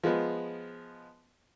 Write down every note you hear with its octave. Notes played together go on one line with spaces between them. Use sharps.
F3 G#3 B3